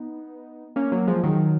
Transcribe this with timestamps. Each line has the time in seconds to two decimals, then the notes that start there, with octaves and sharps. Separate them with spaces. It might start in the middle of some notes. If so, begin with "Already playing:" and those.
Already playing: B3 D#4
0.76 A#3 C#4
0.92 F#3 A#3
1.07 F3 G#3
1.23 D#3 F#3